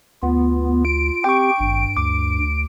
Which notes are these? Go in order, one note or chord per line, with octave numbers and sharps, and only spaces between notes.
D2 B3 F4
D7
C4 G4 G5 C#6
G#1 G2
D2 D6